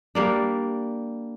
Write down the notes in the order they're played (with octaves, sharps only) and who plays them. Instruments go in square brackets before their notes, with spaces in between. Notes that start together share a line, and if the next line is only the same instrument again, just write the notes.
[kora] G3 A#3 D4